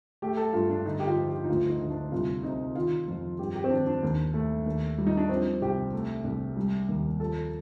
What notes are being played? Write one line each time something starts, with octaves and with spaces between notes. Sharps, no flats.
A3 G4
A4
G2 F4
D4
D3 D#4
G4
F4
F3
G4
D#4
D2 F4
D#4
D2
D4
C2 F4
C3 D#4
D#3 F4
F2
G2 G4
G4
C4
D#3 D4
D4
D#2
A3
D#2
G3
D#4
D4
F3 C4
C2 G4
A3
C2
G3
D#2
F3 A4